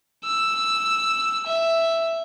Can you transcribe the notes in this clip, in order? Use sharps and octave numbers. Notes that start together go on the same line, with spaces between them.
E6
E5